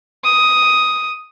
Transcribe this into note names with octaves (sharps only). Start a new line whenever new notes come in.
D#6